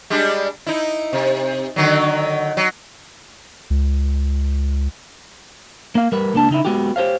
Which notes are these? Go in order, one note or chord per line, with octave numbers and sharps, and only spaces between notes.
G3 G#3 D4
D#4 E4
C3
D3 D#3 F#3
F#3
C#2
A#3 F5
G3 A#4 B4
C#2 A#3 D4 A5
C#3 D#4 E4
G#3 B3 F#4 G4
G4 C5 C#5 F5